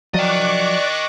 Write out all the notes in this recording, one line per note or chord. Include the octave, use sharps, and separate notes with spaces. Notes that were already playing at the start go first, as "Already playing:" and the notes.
F3 F#3 D5 D#5 G5 C#6 D6 F#6